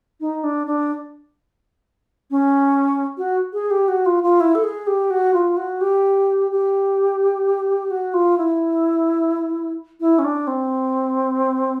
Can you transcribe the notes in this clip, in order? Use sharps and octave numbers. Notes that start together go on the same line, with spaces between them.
D#4
D4
D4
C#4
F#4
G#4
G4
F#4
F4
F4
E4
A4
G#4
G4
F#4
F4
F#4
G4
G4
F#4
F4
E4
E4
C#4
D4
C4